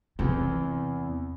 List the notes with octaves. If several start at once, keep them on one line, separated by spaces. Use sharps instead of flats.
E2 C3